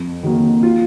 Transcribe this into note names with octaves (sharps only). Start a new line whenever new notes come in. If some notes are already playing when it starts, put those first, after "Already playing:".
Already playing: F2
D#3 F#3 A#3
F4